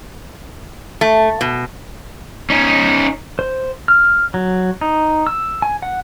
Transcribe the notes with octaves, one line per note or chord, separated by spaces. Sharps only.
A3
B2
C#4 D#4
C5
F6
F#3
D#4
E6
G#5
F#5